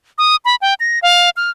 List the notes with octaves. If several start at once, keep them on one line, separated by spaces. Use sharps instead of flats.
D#6
B5
G5
A#6
F5
F6